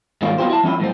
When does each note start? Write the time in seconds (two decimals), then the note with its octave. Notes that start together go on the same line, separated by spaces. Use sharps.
0.22 G#2 D#3 G3 A#3 F4 C#5
0.38 F#3 B3 C#4 F4 G4 C5
0.50 E4 A5
0.63 F3 C#4 E4 F4
0.80 A2 F#3 C5